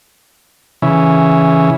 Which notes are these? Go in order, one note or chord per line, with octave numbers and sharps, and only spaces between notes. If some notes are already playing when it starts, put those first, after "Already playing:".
C#3 E3